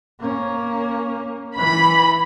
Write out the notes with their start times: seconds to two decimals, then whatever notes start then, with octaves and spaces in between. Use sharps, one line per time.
0.20 A#3 C#4
1.56 E3 B5